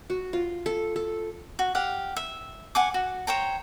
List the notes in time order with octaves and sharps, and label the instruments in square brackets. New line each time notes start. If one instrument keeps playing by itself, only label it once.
[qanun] F#4
F4
A4
A4
[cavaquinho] F#4
G4 F5 F#5
E5
F#5 G#5 D6
F#4
C5 C#5 G5 A#5